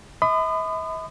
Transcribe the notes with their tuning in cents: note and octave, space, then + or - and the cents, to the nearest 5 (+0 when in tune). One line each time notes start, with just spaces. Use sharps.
E5 -45 B5 +35 D#6 -30